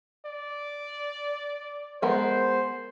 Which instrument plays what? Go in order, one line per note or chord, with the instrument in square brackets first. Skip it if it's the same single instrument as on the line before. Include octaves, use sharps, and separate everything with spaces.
[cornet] D5
[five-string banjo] G#3 B3 A#4 [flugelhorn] C5